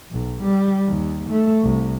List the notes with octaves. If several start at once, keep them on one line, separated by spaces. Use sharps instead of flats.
B1
G3
D#2
A3
C2